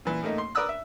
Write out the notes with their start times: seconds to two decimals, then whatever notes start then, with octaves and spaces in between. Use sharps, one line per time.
0.05 A#2 E3
0.23 A2 A3 A#3 D#4
0.38 C6
0.55 A#4 B4 D5 D#6 E6 F#6
0.69 E5